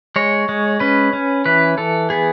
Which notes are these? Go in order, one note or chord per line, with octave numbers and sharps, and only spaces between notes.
G#3 C#5
G#3
C#4 B4
C#4
E3 B4
E3 A4
B3 G#4